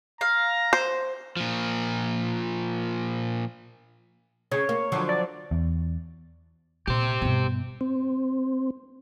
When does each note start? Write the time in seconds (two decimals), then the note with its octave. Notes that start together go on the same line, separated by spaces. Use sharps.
0.21 F5 A#5
0.73 C5
1.37 A#2 F3
4.52 C#3 C#5
4.69 A#3
4.92 D3 F3 F#3
5.09 D5
5.51 E2
6.87 A#2 G4 C5
7.22 G2 B2
7.81 C4